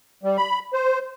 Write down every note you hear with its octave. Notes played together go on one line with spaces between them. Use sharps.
G3
B5
C5